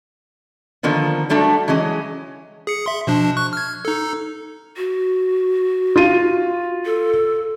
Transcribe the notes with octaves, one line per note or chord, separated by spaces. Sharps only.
D3 D#3 F3 A#3 B3
F#3 G3 A3 D4 F#4
E3 F#3 G#3 C#4
G#4 C#7
E5 C6
B2 F3 D4
C#6 F#6
F6 G#6
D#4 A4
F#4
F4 D#7
A4